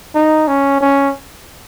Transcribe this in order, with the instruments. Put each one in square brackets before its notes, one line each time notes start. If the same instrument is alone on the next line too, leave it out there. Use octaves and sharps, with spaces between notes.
[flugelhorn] D#4
C#4
C#4